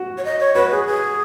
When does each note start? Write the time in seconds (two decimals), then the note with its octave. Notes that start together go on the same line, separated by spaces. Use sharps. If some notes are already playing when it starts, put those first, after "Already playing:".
Already playing: F#4
0.18 C#5
0.25 D#5
0.40 C#5
0.55 F#4 B4
0.71 G#4
0.87 G#4